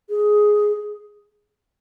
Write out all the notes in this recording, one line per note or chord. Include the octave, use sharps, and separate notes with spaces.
G#4